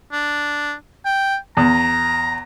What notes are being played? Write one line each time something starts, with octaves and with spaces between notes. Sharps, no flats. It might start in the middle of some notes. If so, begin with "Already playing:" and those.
D4
G5
E2 A#5